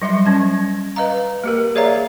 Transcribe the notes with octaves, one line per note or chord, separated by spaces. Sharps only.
F#3 G3 E5 C6
F#3 C#4 A5
B4 D#5 F5 A#5
A#3 G4 A#4
G#4 C#5 D5 E5 F5 A#5